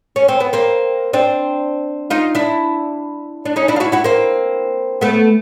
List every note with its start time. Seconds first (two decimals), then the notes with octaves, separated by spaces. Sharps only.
0.16 C#4
0.28 C4
0.40 B3
0.53 A#3 C4
1.13 C4 D4
2.10 D#4 F4
2.35 D4 E4
3.45 D4
3.56 C#4 D#4
3.68 D4 E4
3.76 F4
3.80 E4 F#4
3.92 E4 F#4
4.04 A#3 C4
5.01 A3 B3